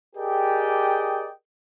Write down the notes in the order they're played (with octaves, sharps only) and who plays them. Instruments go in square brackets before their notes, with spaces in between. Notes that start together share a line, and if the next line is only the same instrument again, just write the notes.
[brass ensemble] G4 G#4 A#4 D5 D#5 G5